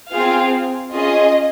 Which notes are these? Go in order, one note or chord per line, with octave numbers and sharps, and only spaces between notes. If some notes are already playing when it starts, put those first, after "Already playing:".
C4 F4 G#4 F5
C#4 F4 G#4 D#5